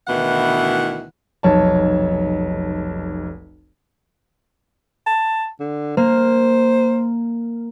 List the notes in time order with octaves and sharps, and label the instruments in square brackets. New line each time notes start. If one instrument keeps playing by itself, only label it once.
[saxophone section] D2 B2 D#3 E3 E4 F#5
[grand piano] F1 B1 C#5 A5
[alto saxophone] A5
D3
[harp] A#3 [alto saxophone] C5